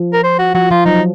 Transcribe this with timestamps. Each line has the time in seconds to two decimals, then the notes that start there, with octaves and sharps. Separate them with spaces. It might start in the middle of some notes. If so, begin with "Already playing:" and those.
Already playing: F3
0.13 A#4
0.24 C5
0.39 F#4
0.55 F3 F#4
0.70 F3 F4
0.85 F#3 D#4